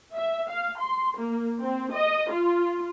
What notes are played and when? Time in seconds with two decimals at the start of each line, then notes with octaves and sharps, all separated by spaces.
0.15 E5
0.49 F5
0.80 C6
1.18 A#3
1.61 C4
1.92 D#5
2.30 F4